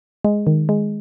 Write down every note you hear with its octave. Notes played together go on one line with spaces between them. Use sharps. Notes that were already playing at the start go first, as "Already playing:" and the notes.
G#3
D#3
G#3